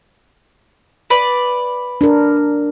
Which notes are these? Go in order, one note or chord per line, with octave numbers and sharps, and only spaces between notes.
B4 D5
D4 A#4